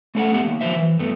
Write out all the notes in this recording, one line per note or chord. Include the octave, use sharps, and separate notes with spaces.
A3 C#4 D4 A4 E5 F#5
A3 B3 G4 F#5
D#3 A#3
F3 F#3 C5 E5
E3
G2 A3 B3